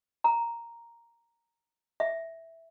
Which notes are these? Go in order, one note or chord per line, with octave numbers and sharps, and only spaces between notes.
A#5
E5